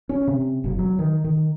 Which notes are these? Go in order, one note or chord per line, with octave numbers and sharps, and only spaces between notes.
C#4
C3
F#1
F#3
D#3
D#3